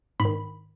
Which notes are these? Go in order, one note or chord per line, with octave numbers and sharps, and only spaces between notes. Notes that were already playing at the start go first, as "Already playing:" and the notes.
G#2 B5
D#3